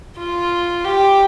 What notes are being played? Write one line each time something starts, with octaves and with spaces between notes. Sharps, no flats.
F4
G4